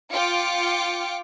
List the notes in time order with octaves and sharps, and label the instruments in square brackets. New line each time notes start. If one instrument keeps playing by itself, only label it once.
[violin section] F4 F5 G5 D6 C#7